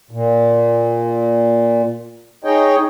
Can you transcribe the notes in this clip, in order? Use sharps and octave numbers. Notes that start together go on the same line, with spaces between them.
A#2
D#4 G#4 C#5 D#5 G5